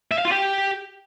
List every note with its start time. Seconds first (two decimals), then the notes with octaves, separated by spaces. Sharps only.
0.11 E5
0.18 F5
0.25 F4
0.32 G4